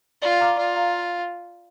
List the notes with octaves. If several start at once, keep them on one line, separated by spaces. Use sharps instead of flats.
F4 D5
F5 A#5 D6 F6
F4 D5
F5 A#5